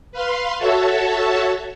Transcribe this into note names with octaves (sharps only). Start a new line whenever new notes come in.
B4 F5 C6
F#4 A4 C#5 E5 A5